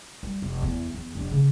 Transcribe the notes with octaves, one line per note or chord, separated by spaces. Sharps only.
G3
F1
E2
E2
F1 D4
C#3